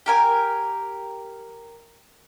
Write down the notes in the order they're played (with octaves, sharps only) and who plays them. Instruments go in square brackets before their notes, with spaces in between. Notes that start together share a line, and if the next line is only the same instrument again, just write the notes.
[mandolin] G4 A#4 G#5